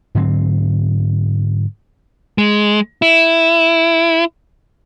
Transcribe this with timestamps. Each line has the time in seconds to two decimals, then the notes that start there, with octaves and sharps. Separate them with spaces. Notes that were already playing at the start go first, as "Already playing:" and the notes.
0.15 G#2 D3 F#3 C4
2.38 G#3
3.02 E4